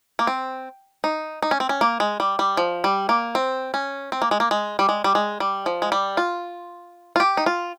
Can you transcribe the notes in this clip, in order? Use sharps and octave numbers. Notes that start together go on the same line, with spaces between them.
A#3
C4
D#4
D#4
C#4
C4
C#4
A#3
G#3
G3
G3
F3
G3
A#3
C4
C#4
C4
A#3
G#3
A#3
G#3
G3
G#3
G3
G#3
G3
F3
G#3
G3
F4
F4
G4
D#4
F4